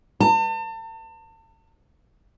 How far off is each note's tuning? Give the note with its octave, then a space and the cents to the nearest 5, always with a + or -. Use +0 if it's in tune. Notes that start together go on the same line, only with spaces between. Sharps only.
A5 +40